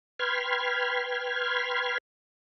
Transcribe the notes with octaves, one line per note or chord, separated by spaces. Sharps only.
B4 G5 B5 C6 F6 G#6